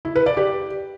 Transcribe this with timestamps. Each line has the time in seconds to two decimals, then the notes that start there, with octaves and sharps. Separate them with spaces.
0.05 E4
0.16 B4
0.26 D5
0.37 G4